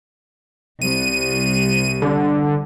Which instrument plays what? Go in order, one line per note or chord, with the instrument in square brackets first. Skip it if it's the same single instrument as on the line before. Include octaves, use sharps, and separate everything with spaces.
[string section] C2 [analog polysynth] D#7
[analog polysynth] D3